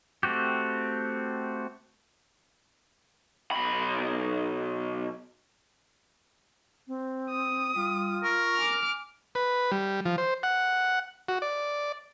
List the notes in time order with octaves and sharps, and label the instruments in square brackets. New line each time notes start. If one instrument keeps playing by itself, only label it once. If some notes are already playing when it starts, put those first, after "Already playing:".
[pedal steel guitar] A3 C4 F#4 G4
[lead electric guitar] B1 B5
[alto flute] C4
[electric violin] D#6
[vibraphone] G3 [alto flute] F4
[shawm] A#4 [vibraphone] C#6
[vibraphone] G#5 [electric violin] D6 F6
[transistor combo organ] B4
G3
F3
C5
F#5
F#4
D5